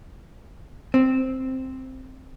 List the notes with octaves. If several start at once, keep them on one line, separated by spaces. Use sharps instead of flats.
C4